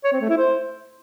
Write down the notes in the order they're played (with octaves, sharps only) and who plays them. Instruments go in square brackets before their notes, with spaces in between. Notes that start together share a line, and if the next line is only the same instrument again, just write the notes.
[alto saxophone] C#5
C4
A3
E4
C5